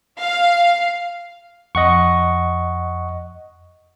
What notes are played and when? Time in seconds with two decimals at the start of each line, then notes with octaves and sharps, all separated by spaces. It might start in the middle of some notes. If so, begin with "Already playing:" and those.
0.17 F5
1.75 F2 D#5 F#5 C#6